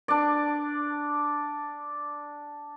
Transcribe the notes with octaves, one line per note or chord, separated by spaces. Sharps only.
D4 D5